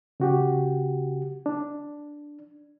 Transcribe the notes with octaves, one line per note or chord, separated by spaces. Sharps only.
C#3 F#4 G4
D4